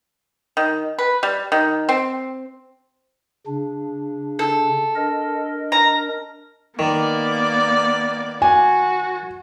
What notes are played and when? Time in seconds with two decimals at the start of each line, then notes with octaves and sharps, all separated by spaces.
0.57 D#3
0.98 B4
1.23 G3
1.52 D#3
1.89 C4
3.47 C#3 D4
4.39 A4
4.96 D4 A#4 D#5
5.72 A#5
6.79 D#3 A#3 B3 D5
8.42 F#4 G#5